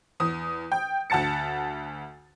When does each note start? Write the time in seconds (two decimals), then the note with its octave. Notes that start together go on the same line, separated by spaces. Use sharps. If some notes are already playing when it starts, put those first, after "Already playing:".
0.20 E2 D#6
0.72 G5
1.10 D2 F#5 A5 A6 C#7